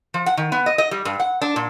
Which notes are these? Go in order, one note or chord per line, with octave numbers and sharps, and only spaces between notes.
F3
F#5
D#3
B3
D#5
D#5
G3
G2
F#5
D4
A#2